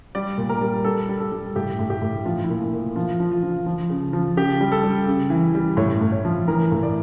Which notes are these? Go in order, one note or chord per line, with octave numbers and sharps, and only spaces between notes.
G3 D5
A#2
A#4
G3
G3 A4
G3
A4
G3
A2 G4
A2
G4
A2
F3 F4
E4
A#2
A#2
F3 F4
F3
F4
F3
F3
C#3
F3
C#3 G4
G3
A4
G3
C#3
E3
G3
A2 C#5
A2
C#5
F3
E3 A#4
A2
D5